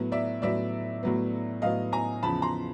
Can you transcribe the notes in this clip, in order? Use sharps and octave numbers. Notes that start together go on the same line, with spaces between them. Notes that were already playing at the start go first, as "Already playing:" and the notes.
Already playing: A2 F#3 B3
D5 E5
A2 F#3 B3 D5 E5
A2 F#3 B3
A2 F#3 B3 D#5 F5
G#5 A#5
E2 C#3 F3 A5 B5
A#5 C6